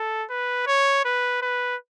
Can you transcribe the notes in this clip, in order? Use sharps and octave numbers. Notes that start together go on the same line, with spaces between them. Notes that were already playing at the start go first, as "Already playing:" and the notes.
Already playing: A4
B4
C#5
B4
B4